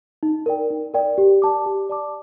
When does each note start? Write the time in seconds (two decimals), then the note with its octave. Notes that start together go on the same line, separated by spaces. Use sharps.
0.23 D#4
0.46 A#4 D5 G5
0.70 D#4
0.94 A#4 D5 G5
1.18 G4
1.42 D5 A5 D6
1.66 G4
1.90 D5 A5 D6